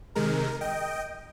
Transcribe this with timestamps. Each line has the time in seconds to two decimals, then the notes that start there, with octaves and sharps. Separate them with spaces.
0.15 C3 D#3 G#3 A#4
0.61 D#5 G5